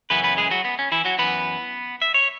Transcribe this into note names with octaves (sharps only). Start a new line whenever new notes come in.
F#2 C#3 E3 B3 B4
B3 B4
G#3 G#4
F#3 F#4
B3
C#4
E3 E4
F#3 F#4
F#2 E3 B3 B4
E5
C#5